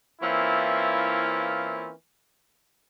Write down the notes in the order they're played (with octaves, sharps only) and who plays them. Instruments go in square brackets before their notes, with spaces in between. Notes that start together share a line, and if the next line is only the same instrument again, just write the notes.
[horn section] E3 A#3 C4 C#4 E4 F4